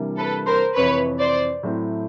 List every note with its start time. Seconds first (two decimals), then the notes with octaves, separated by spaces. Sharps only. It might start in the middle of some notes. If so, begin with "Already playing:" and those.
Already playing: C3 E3 G3 A#3 D4
0.17 A4 B4
0.47 A#4 C5
0.75 F2 C3 E3 B4 C#5
1.19 C5 D5
1.63 A2 F#3 A3 C4 E4